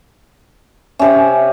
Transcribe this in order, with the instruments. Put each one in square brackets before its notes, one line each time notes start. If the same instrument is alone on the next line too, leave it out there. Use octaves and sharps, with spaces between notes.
[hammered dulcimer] C3 C#4 [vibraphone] E5